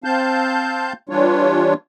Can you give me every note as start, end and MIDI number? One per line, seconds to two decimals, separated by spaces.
0.04 0.93 60
0.04 0.93 77
0.04 0.93 81
0.04 0.93 91
1.09 1.74 52
1.09 1.74 55
1.09 1.74 62
1.09 1.74 65
1.09 1.74 73